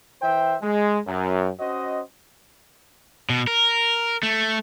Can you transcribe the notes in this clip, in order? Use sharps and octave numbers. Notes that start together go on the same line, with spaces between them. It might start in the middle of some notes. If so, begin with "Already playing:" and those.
E3 C5 E5 G5
G#3
F#2
C#4 F#4 C5 D#5
B2
A#4
A3